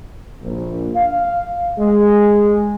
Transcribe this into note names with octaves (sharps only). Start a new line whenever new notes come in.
A#1
F5
G#3